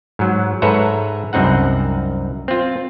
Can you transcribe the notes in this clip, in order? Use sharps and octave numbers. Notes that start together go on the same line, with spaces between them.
G#2 F#3
G#2 A4 B4 C#5 E5 A#5
C2 F#2 C4 D#4 F#5
C4 F4